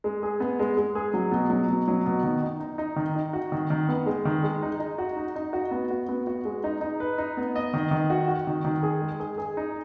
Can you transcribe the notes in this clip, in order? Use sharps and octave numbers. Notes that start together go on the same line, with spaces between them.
G#3
G#4
B3
G#3
G#3
G#4
F#3
B2
F#3
B2
F#3
B2
D#3
D#4
D#4
D#4
D#3
D#4
F#4
D#3
D#3
B3
G#3
D#3
G#3
D#4
D#4
F#4
D#4
D#4
F#4
B3
F#4
B3
F#4
G#3
D#4
D#4
B4
D#4
B3
D#5
D#3
D#3
F#4
F#4
D#3
D#3
G#4
G#3
G#4
G#4
D#4